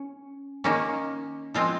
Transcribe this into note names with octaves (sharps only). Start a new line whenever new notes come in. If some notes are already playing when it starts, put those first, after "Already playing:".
Already playing: C#4
D#3 A#3 C#4
F3 G#3 C4 F4